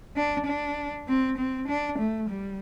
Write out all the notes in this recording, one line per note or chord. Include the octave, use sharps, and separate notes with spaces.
D4
D4
C4
C4
D4
A3
G3